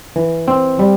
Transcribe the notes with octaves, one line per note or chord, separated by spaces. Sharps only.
E3
C4
G3